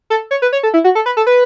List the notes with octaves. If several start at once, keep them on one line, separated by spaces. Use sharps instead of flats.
A4
C#5
B4
C#5
A4
E4
F#4
A4
B4
A4
B4